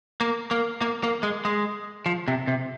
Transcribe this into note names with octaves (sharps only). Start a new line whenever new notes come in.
A#3
A#3
A#3
A#3
G#3
G#3
F3
C3
C3